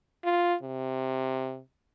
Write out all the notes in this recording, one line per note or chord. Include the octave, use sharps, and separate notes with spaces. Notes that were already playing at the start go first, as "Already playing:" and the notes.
F4
C3